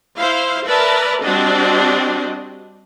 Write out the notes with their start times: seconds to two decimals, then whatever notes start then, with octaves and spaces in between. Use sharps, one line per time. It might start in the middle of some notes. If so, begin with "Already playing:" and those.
0.18 E4 C5 F5
0.66 A#4 B4 D5 E5 A5 B5
1.22 G3 C4 D4 F#4 G4 D#5